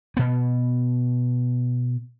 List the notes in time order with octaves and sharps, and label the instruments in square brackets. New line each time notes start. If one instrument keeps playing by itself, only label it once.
[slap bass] B2 B3